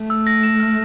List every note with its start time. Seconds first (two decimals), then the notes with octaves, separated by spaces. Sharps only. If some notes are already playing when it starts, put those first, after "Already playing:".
Already playing: A3
0.10 E6
0.27 A#6
0.43 E7
0.60 F6